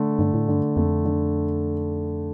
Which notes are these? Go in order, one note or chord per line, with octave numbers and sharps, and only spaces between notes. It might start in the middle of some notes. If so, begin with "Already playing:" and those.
Already playing: D3 A3
G2 D3
A2
G2 D3
F2 A3
D3